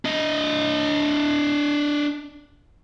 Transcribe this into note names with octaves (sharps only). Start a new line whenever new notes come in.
D4 D#5